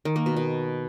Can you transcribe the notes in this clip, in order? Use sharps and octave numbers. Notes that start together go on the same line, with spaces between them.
D#3
A#3
B2
B2